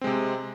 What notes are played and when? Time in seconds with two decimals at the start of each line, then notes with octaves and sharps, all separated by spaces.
0.01 C4
0.04 G#3
0.07 C3